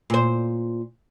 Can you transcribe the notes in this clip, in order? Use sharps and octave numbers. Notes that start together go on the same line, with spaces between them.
A#2 C5